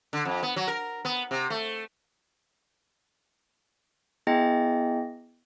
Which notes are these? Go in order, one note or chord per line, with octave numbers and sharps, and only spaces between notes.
D3
F2
B3
F#3
A#4
B3
C3
A3
B3 E4 G#4 D#5 G5 A#6